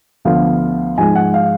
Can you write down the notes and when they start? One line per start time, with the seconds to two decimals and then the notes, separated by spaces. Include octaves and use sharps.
0.25 D2 D3 F3 B3 F5
0.98 G#2 F3 G#3 G#5
1.15 F#5
1.34 F5